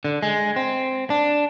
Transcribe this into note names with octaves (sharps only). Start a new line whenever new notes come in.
D3
G#3
C4
D4